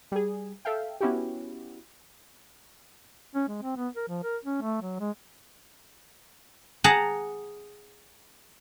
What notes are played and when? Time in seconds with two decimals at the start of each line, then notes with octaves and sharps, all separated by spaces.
0.12 G3 G#4
0.65 A4 E5 F5 G5
1.00 B3 C#4 E4 F#4 G4
3.35 C#4
3.48 G#3
3.62 C4
3.77 B3
3.96 A#4
4.08 F3
4.23 A#4
4.45 C#4
4.62 A3
4.82 F#3
5.00 G#3
6.84 G#4 F#5 A5 A#5